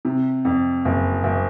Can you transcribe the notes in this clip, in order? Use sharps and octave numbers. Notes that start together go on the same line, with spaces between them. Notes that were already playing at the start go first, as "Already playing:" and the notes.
C3
F2
F#1
F#1